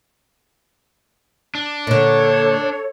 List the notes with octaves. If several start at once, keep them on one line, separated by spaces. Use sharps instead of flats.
D4
A#2 D3 A4 C#5